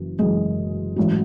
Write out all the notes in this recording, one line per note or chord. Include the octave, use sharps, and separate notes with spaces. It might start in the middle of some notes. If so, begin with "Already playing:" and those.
Already playing: F#1 F#2 E3
F#1 F#2 E3 G#3 G#4
A1 G#2 F#3